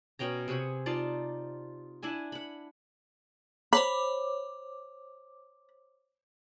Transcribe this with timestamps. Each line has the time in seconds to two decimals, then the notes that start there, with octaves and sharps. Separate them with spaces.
0.19 B2 C#4 G5 A#5
0.48 C3 G#4 B5 C#6
0.86 D#4 F4 D5 A5
2.03 D4 E4 E5 G#5
2.32 F#5 B5
3.73 C5 C#5 B5 D6